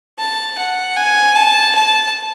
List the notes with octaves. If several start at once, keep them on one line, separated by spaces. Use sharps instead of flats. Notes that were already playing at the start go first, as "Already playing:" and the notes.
A5
F#5
G#5
A5
A5